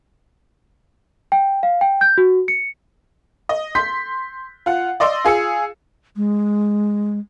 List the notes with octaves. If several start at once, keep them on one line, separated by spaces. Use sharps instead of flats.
G5
F5
G5
G6
F#4
C#7
D#5
C6 G6 B6
F4 F#5
D5 D#5 C6 D6 E6
F4 G#4 E6 C#7
G#3